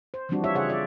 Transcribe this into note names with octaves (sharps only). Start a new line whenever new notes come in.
C5
E3 F3 G3 C4 D4 F#4
F4 G4 C#5 E5
C#3 G#4 C#5 E5 F#5
F4 D5 E5